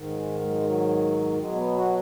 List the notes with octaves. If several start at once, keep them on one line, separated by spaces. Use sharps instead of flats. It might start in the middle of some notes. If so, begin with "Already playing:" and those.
Already playing: G#2 D#3
F#3
G#3
G#3
F#3
G#3
F#3
B2 F#3 G#3
B3
F#4